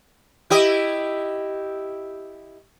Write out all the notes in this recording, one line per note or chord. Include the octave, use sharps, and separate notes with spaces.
E4 G4 D#5